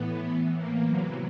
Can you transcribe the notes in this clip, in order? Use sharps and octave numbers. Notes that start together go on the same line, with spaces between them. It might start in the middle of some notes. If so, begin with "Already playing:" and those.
Already playing: A2 E3 B3
A2 E3
A#3
E2 C3 E3 F#3